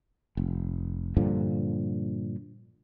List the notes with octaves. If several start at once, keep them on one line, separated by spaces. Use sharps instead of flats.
F1
G2 A#2 D3 F3